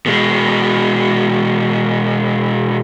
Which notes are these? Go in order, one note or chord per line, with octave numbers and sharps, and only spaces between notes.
B2 G#3